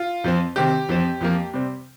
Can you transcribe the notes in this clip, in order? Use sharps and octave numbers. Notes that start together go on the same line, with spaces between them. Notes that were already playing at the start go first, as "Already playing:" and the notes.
Already playing: F4
F2 F3 C4
C3 D#3 C4 G4
F2 F3 C4
F2 F3 A#3
C3 G3 C4